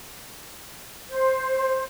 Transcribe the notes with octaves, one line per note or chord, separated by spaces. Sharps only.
C5